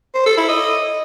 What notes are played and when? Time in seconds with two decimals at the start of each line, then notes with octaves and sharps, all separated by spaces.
0.14 C5
0.26 A4
0.37 E4
0.48 D#5